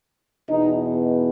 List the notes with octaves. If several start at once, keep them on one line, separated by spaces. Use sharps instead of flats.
E2 B2 D#4